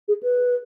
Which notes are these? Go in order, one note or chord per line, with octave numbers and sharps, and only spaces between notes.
G#4
B4